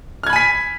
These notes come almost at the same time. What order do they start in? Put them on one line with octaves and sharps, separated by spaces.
F6 G#6 B5 G#5 B6